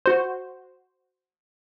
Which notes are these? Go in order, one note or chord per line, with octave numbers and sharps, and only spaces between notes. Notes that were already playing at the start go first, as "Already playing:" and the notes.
F#4 C5